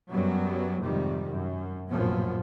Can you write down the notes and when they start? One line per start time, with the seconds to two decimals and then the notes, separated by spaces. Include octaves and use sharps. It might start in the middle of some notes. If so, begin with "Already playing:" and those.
0.11 F#2 F#3 G3 B3
0.80 F2 G#2 C3 D#3 G3
1.31 F#2
1.89 F1 A#1 F#2 A2 F3 B3